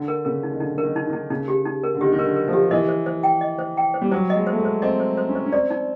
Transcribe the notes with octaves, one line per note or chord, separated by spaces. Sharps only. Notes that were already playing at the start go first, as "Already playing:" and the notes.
Already playing: D3 D#4
A#4
C#3 A#4
D#4
D#3
D3 D#4
D3 A#4
D#3
D#4
D#3
D#4
C#3 D#4
G4
D#4
A#4
D3
D#3 G4
D#3
A#4
D3
A#4
F3
G4
E3 D#5
C5
C5
G5
D#5
C5
G5
C5
G3
F#3 C5
D#5
G#3
C5
A3
G#3
C5
C4 D#5
C5
C5
C#4
C5
C#4
C4 D5
D#4